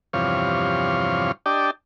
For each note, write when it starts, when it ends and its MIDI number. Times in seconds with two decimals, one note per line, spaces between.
0.13 1.32 40
0.13 1.32 43
0.13 1.32 48
0.13 1.32 53
0.13 1.32 73
0.13 1.32 77
1.46 1.71 62
1.46 1.71 67
1.46 1.71 74
1.46 1.71 75
1.46 1.71 79
1.46 1.71 81